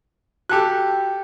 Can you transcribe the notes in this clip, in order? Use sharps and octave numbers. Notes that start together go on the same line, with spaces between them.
F#4 G4 A4 G5 F#6